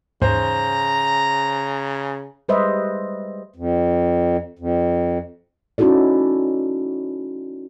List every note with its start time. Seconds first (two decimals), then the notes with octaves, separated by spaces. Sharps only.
0.22 D#2 G#2 C#3 E3 C5 A#5
2.48 G3 G#3 B4 C5 D#5 E5
3.56 F2
4.59 F2
5.78 C#4 D#4 E4 F#4 A4 D5